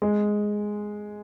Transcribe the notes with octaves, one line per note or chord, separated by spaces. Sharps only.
G#3